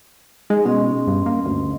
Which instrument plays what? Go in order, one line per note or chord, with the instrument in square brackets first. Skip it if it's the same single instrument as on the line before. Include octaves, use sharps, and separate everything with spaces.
[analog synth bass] G#3 [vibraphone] D#4
[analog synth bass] B2 [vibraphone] C#4 D#5 C6
[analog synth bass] G2
A#3
D2